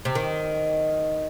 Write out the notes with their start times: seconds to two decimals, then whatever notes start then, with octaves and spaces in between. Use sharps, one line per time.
0.05 C3
0.15 D#3